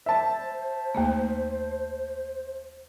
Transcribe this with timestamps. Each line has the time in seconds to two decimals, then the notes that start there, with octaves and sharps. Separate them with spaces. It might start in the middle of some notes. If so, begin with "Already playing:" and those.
0.06 C5 E5 A5
0.95 D#2 A3 A#3